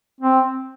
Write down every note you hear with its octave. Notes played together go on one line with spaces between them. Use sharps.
C4